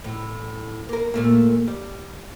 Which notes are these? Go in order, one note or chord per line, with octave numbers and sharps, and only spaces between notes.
A2
A#3 A#4
A#2 A3 A#3
G3